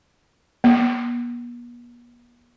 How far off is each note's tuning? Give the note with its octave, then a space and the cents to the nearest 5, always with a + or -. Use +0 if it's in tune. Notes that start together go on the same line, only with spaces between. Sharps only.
B3 -45